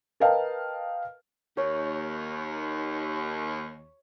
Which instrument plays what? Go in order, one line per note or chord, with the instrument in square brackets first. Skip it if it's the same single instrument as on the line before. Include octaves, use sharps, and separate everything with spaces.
[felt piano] A#4 B4 D#5 F5 G5 A5
[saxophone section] D#2 [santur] C#5